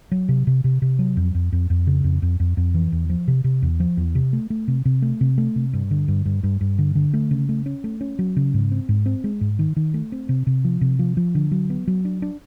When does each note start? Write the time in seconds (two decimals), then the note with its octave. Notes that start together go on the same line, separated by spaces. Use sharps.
0.12 F#3
0.29 C3
0.47 C3
0.64 C3
0.82 C3
0.99 F#3
1.17 F2
1.35 F2
1.52 F2
1.70 F2
1.87 C#3
2.04 F2
2.22 F2
2.40 F2
2.57 F2
2.74 E3
2.92 E2
3.10 F3
3.28 C3
3.44 C3
3.62 E2
3.80 F3
3.97 E2
4.15 C3
4.33 A3
4.50 A3
4.68 C3
4.85 C3
5.02 A3
5.21 C3
5.38 A3
5.56 C3
5.73 G2
5.91 D3
6.08 G2
6.26 G2
6.43 G2
6.61 G2
6.78 D3
6.95 D3
7.14 A3
7.31 C#3
7.49 A3
7.66 C#4
7.84 A3
8.01 C#4
8.19 F#3
8.36 C#3
8.54 G#2
8.72 C4
8.89 G#2
9.06 C4
9.24 G#3
9.41 G#2
9.59 D#3
9.76 D#3
9.94 A3
10.12 C4
10.29 C3
10.47 C3
10.64 F3
10.81 C3
10.99 F3
11.17 F3
11.35 D3
11.51 F#3
11.70 B3
11.87 F#3
12.05 D4
12.22 D4